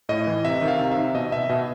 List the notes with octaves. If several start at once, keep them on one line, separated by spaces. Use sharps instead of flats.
A2 D#5
E3
C3 E5
D#3
F5
C3
E5
D#3
B2 D#5
B2 E5
B2 D#5